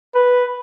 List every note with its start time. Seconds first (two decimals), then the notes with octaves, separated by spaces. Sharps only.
0.15 B4